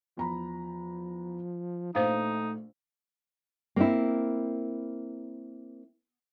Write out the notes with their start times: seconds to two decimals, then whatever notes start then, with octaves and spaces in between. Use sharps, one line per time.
0.17 E2 F3 A#5 B5
1.95 A#1 A3 D#4 C5 F5
3.76 A#3 C4 E4